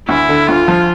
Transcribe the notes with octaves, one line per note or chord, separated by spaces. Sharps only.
D2 E4
D3
D2 F4
F3